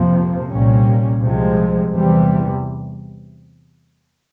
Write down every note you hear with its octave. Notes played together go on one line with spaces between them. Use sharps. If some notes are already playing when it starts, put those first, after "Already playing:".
Already playing: F2 C3 F3 A#3
C2 A#2 G3 A#3 C#4
C2 C3 F3 G#3
E2 C3 E3 G3